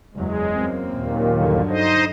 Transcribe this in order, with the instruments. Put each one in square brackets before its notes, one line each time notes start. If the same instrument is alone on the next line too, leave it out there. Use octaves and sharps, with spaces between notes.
[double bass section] F#1 E2 F#3 [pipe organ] G#3
[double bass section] F#2 A#3 C4
[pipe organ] D#2 A#2
[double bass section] G2 D3 F#3
[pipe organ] D#4 C5 D#5